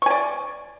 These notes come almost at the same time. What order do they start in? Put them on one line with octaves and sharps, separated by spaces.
C#6 G#5 D5